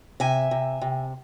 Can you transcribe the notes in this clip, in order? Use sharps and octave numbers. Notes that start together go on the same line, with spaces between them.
C3 E5 G#5
C3
C3